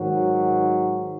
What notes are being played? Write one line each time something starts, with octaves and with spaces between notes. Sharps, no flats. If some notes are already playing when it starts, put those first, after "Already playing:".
Already playing: G#2 D#3 F#3